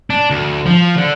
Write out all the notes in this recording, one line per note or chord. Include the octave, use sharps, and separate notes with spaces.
D4
D2
F3
D3